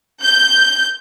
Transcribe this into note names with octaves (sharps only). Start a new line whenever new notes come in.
G6